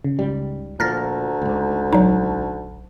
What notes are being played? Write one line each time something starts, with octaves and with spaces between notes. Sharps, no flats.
C#3
C#2 G#2 G3
D2 A#2 F3 A#5 F6 A6 A#6
C#2 G#2
A#1 F#3 D#4